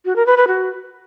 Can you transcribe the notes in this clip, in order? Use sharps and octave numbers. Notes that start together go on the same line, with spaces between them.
F#4
A#4
B4
B4
F#4